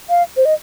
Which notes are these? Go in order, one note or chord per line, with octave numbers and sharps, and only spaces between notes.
F5
C5
D#5